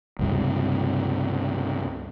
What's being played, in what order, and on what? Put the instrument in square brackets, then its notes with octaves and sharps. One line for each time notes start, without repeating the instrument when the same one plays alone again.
[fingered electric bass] C#2 G2 C3